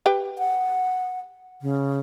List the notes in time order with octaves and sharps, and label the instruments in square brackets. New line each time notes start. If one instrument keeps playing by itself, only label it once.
[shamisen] G4 B4 G5
[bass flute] F#5
C#3